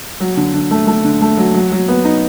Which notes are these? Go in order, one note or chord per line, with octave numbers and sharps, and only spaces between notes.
F#3
D3
D3
A3
A3
D3
A3
F#3
F#3
F#3
B3
D#4